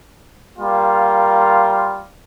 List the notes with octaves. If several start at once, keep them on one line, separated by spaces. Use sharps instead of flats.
G3 A#3 F4